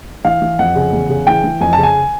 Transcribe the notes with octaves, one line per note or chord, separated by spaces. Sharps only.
E3 F5
E3
F2 F#5
C#3
E2
C#3
E3 G5
E3
F2 G#5
C#3 A5
G#5